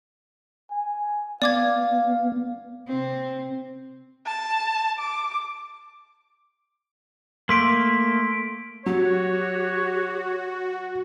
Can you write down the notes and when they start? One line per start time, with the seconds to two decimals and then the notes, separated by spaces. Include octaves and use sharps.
0.71 G#5
1.42 B3 D5 F5 D6 G#6
2.88 C3 C4
4.26 A5
4.99 D6
7.49 A3 A#3 C6 B6 D7
8.86 F#3 F#4 G4 C#5